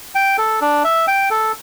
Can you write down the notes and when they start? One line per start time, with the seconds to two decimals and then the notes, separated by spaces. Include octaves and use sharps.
0.15 G5
0.38 A4
0.61 D4
0.84 E5
1.08 G5
1.30 A4